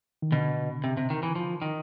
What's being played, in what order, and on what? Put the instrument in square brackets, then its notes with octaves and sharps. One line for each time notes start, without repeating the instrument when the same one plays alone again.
[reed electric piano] D#3
[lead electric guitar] B2 [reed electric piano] D3
[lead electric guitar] C3
C3
D#3
E3
F3
D#3